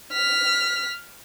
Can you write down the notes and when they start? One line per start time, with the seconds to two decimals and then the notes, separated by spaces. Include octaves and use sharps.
0.13 F6 B6